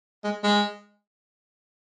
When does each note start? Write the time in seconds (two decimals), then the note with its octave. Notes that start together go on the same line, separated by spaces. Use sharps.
0.24 G#3
0.44 G#3